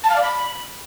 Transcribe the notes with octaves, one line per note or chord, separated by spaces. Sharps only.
A5
F5
D5
B5